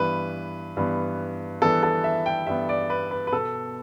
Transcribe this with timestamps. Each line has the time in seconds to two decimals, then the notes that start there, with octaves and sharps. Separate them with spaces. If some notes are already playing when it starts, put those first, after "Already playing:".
Already playing: G2 E3 B3 B4
0.77 G2 E3 B3
1.62 G2 E3 B3 A4
1.83 A4
2.04 E5
2.26 G5
2.47 G2 E3 B3 E5
2.69 D5
2.90 B4
3.11 B4
3.27 B4
3.33 B2 B3 A4